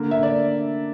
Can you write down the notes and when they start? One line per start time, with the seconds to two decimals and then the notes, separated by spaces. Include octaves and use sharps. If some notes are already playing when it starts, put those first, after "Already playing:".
Already playing: D3 A#3
0.11 E5
0.23 D5